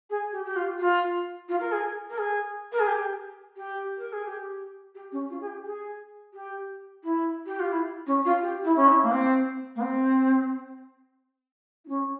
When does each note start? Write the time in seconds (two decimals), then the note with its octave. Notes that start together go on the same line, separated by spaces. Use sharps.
0.10 G#4
0.32 G4
0.45 G4
0.56 F4
0.79 F4
1.48 F4
1.60 A#4
1.72 G#4
2.09 A#4
2.18 G#4
2.72 A#4
2.79 G#4
2.87 G4
3.56 G4
3.97 A#4
4.12 G#4
4.25 G4
4.94 G4
5.12 C#4
5.30 F4
5.40 G#4
5.47 G4
5.64 G#4
6.34 G4
7.03 E4
7.46 G4
7.59 F4
7.72 E4
8.06 C#4
8.25 F4
8.42 G4
8.64 E4
8.76 C#4
8.88 E4
9.02 A#3
9.11 C4
9.75 A#3
9.81 C4
11.85 E4
11.88 C#4